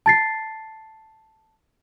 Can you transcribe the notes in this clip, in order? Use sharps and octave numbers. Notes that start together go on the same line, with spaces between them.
A5 A6 C7